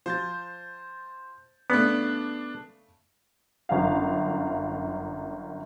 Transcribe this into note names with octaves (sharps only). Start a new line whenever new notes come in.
F3 C5 G6 A6
C#3 A3 B3 D4 D5
G1 F#2 F5